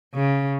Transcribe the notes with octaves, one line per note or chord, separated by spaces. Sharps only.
C#3